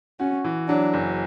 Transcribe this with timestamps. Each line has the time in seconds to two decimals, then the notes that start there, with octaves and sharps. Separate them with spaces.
0.20 C#4 F#4
0.44 E3
0.69 F#3 D4
0.93 F#1